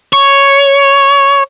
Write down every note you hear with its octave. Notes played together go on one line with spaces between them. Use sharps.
C#5